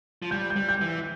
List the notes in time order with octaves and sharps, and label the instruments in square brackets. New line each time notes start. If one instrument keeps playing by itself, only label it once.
[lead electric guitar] F3
[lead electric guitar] G3 [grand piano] G6
[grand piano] G6
[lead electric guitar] G3
[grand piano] G6
[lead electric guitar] E3